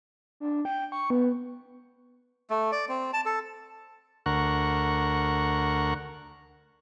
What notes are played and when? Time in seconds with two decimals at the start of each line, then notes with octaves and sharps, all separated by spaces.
0.40 D4
0.65 G5
0.92 C#6
1.10 B3
2.50 A3
2.72 D5
2.89 C4
3.13 A5
3.26 A4
4.26 D2 A#4 F#5 C#6